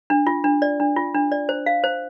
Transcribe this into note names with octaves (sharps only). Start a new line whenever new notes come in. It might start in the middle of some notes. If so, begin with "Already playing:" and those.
D4
F4
D4
D5
D4
F4
D4
D5
C5
F5
C5